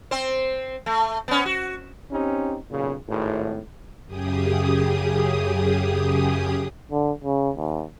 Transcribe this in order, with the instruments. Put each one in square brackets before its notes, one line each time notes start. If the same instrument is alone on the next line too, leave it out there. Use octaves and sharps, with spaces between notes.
[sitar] C4 C5
A3
B3 C#4
F#4
[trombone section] C4 C#4 D#4 G4
B1 A#2 C#3
G#1 A2
[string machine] F#2 C#3 G4 G#4 D#6
[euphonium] D3
C#3
D#2